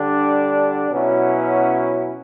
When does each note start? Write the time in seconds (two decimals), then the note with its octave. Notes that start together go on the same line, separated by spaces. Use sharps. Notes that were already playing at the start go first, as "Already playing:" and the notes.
Already playing: D3 G3 D4
0.90 B2 F#3 C#4 E4